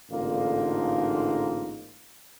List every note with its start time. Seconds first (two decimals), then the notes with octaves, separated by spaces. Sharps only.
0.10 A1 G#2 D3 A#3 D#4 F4